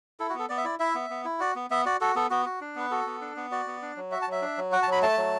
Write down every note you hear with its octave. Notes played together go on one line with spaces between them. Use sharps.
E4 A4
F#4
B3 A4
B3 D5
E5
E4 D5
E4 E5
B3
B3
E4
F#4 D5
B3
B3 E5
F#4 D5
F#4 A4
B3 A4
B3 F#4
F#4
D4
B3 B4
F#4 A4
B3
D4
B3
F#4 D5
B3
D4
F#3
F#4 E5
A5
F#3 E5
D4
F#3
F#4 F#5
A5
F#3 B5
A3 A5
F#3